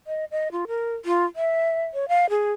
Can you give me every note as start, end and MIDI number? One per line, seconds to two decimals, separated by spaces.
0.07 0.25 75
0.31 0.51 75
0.52 0.65 65
0.68 0.95 70
1.05 1.25 65
1.36 1.83 76
1.94 2.08 73
2.08 2.29 77
2.30 2.52 68